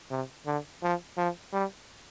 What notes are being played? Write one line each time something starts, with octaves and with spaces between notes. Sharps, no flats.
C3
D3
F3
F3
G3